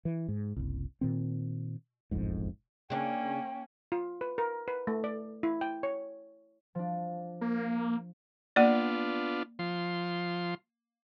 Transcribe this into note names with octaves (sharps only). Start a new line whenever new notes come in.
E3
G#2
F#1 C2
A#2 D#3 C4
E1 A1 F2 G#2
C#3 A#3 C#4 D4 G5
F4
B4
A#4
B4
A3
D5
E4
G5
C#5
F3 D4
A#3
A#3 B3 D4 F4 D5
F3 C6